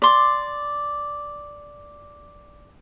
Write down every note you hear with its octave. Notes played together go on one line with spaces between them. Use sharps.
D5 C6